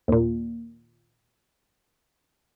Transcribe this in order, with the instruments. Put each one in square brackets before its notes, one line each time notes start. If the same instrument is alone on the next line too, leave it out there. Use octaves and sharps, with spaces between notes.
[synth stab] D#2 A#2